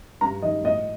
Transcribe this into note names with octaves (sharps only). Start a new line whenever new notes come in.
G2 A#5
D#3 D#5
A2 D#5